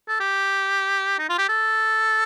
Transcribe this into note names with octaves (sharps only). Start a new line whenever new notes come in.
A4
G4
D#4
F4
G4
A4